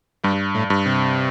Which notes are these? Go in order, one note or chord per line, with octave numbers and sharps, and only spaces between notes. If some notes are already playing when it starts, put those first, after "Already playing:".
G2 G3
A2
G2
C3